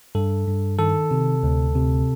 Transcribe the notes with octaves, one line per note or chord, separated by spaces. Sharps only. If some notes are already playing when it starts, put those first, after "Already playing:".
G2 A4
G2
D#3 A4
C3
D2
C3